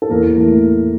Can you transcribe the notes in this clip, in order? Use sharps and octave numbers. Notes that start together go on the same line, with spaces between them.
A4
E2 A#3 A#4
E3 A3